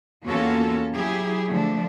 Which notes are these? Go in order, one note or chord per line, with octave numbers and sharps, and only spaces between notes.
E2 A#3 C#4 F4 F#4 A4
F#3 E4 G4 G#4
D3 F3 A3 D4